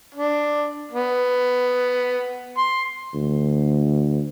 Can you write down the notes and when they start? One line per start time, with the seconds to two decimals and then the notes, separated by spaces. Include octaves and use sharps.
0.15 D4
0.92 B3
2.58 C6
3.14 D2